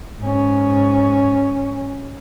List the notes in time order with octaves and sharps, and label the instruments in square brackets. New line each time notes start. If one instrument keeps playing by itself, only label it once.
[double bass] G#2 C#4